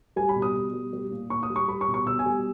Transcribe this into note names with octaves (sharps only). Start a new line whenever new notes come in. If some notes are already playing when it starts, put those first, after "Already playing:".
G3 G#5
B5
B2
D#6
B2
G3
G3
A#2
A#2 C#6
D#6
G3
C#6
G3 B5
C#6
B2
C#6
B2 E6
G#5
G3